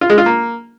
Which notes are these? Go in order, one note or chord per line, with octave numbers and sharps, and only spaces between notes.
F4
G#3
F4
A#3